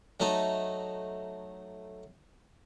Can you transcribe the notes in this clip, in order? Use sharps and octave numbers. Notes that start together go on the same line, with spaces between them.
F#3 A3 D#4 A4